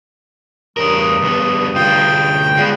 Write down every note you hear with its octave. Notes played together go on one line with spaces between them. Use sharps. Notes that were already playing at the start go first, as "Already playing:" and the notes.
E2 G2 G3 A#4 D#6
D#2 B3
D2 F4 G5
G3 G#3 B3 F4